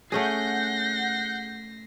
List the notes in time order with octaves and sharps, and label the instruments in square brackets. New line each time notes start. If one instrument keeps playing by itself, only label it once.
[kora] A3 C#4 G#4 [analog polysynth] F#5 G6 [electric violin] A#6 C7